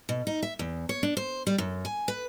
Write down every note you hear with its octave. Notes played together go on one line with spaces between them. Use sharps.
B2
D#4
E5
E2
C#5
D4
C5
G3
F#2
G#5
B4